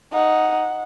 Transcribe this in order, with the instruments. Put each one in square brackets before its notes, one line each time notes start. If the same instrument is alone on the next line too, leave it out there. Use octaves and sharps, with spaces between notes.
[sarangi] D#4 [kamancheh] F#5